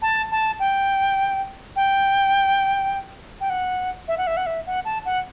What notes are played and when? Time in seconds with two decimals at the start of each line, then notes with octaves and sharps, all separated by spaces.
0.02 A5
0.31 A5
0.60 G5
1.76 G5
3.41 G5
3.50 F#5
4.08 E5
4.18 F#5
4.27 E5
4.37 F#5
4.46 E5
4.67 F#5
4.85 A5
5.05 F#5